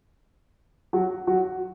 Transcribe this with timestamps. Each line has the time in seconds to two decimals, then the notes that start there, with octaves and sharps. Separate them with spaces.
0.93 F#3 F#4
1.27 F#3 F#4